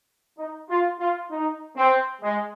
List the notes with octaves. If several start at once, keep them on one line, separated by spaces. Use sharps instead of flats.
D#4
F4
F4
D#4
C4
G#3